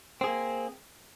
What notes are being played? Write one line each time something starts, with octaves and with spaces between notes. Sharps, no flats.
A#3 C4 G#4